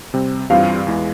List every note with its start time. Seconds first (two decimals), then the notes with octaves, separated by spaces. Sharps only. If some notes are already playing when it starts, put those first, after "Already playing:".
0.14 C3 G3 C4
0.50 G2 E3 G3 C4 F4 F5
0.87 E2 E3 G#3